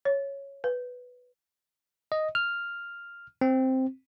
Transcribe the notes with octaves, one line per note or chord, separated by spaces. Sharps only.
C#5
B4
D#5
F6
C4